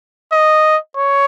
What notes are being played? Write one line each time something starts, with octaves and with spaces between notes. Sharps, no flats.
D#5
C#5